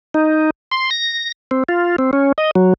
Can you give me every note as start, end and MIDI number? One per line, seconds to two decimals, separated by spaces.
0.14 0.50 63
0.71 0.90 84
0.91 1.32 94
1.51 1.63 60
1.69 1.96 65
1.98 2.11 60
2.13 2.32 61
2.38 2.51 75
2.55 2.74 54